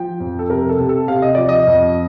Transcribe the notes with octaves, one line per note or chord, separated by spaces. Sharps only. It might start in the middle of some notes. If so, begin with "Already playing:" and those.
Already playing: F3 G5
F2
A4
C3 A#4
A4
C3
A4
C3 F5
D#5
F3 D5
D#5
F2